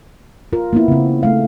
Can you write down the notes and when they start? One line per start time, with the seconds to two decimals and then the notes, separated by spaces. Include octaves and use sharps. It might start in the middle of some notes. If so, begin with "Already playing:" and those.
0.53 F4 A#4
0.73 A#3 B3 E4
0.88 C#3 C4
1.23 A3 F5